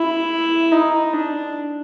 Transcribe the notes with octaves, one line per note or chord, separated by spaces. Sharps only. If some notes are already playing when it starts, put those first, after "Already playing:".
Already playing: E4
D#4
D4